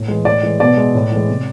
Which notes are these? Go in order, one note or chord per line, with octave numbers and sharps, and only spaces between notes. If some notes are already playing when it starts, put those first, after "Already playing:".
Already playing: A2
E3 G#3
A2 D5
E3 G#3
B2 D5
G#3
A2
E3 G#3
C3